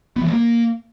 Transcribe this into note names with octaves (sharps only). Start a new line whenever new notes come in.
B3
E3
G#3
A#3